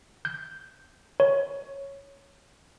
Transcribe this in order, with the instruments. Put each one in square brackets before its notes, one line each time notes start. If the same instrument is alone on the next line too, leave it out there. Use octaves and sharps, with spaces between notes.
[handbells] G6
C#5